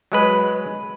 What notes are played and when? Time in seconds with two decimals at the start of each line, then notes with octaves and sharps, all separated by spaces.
0.12 F#3 G#3 B4